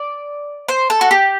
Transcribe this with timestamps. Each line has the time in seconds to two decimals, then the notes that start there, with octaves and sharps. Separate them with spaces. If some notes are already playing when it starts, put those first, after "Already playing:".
Already playing: D5
0.68 C5
0.90 A4
1.01 F#4
1.11 G4